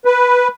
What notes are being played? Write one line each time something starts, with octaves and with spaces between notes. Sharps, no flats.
B4